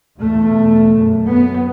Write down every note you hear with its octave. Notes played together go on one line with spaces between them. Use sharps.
E2 B2 A3
F#2
B3